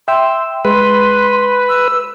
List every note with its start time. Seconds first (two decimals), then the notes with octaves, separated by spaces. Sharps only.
0.08 E5 G5 C6 E6
0.65 G#3 B4 C6
1.69 E6